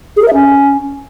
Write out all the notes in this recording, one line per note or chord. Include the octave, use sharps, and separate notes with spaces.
G#4
A#4
E5
C#4